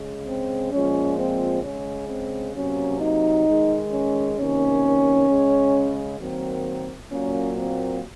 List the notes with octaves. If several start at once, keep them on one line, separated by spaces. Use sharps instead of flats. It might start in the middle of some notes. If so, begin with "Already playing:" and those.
Already playing: C#3 G#3
C4
A#2 F3 G#3 C#4
C4
C#3 G#3 C#4
C4
C3 F#3 A#3 C#4
D#4
D#3 G#3
C#4
C3 D#3 A#3 C#4
C#3 G#3
D#3 F#3 A#3 C4
A#2 F#3 A#3 C#4
C4